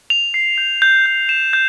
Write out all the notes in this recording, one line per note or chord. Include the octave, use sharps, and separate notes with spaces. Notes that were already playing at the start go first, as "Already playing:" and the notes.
F7
C7
G6
G6
G6
E7
G6